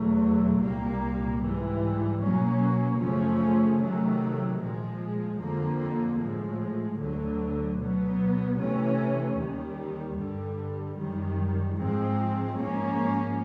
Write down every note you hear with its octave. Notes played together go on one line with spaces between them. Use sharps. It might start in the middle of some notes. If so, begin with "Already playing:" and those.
Already playing: E2 B2 F#3 A3
C2 A#2 G3 A#3
G#2 E3 G3
B2 F#3 A#3 C#4
F#2 C#3 F3 A3 C#4
C3 D#3 F#3 A3
A#2 F3 G#3
F2 D3 F3 A#3
A2 F3 G#3
D2 D3 F#3
B2 F#3 B3
C3 E3 A3 C#4
D#2 D#3 G3
G2 D3 G3
F#2 D#3 G3
G#2 F3 G#3 C4
G#2 F3 A#3 C#4